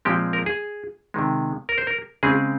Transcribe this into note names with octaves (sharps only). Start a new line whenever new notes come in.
A#2 F3 G#3 C4 G4
A#4
G#4
C3 D#3 G#3
A#4
C5
A#4
C#3 G#3 C4 G#4